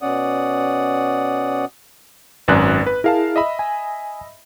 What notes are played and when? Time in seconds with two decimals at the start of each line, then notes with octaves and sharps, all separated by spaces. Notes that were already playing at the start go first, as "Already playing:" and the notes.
0.02 B2 C#4 D5 F#5 D#6
2.48 G#1 F#2 B4 D5 F#6
2.86 B4
3.04 E4 G#4 A#4 F5 A5
3.36 D#5 E5 B5
3.59 G#5